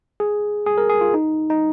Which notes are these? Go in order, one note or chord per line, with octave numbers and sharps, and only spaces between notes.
G#4
G#4
A#4
G#4
F4
D#4
D#4